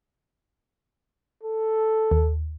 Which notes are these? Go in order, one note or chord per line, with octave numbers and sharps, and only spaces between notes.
A4
D#2